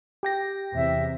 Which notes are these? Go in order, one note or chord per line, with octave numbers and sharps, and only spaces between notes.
G4 G5 A#6
E2 C3 E5